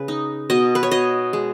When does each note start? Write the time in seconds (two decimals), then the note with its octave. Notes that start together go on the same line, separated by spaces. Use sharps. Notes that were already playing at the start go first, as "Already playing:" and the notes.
Already playing: C#3 B4
0.08 D#4
0.50 B2 D#5
0.75 B4
0.83 C#5
0.91 B2 D#5
1.33 G#3